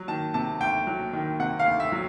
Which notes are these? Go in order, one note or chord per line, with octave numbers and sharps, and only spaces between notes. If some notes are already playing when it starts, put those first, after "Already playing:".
Already playing: F#3
D#3 A5
C3 A5
D2 G5
F#3
D#3
C3 F#5
F5
D2
E5
F#3